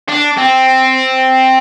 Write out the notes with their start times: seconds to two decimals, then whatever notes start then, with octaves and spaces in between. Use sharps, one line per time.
0.08 D4
0.37 C4